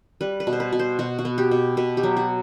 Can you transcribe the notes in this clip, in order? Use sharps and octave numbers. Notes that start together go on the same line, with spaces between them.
G3 B4
B4
B2
C5
B4
B2
C5
B2 F#4
F#4
B3
G4
B2
B2 B4
G4
F#3
F#4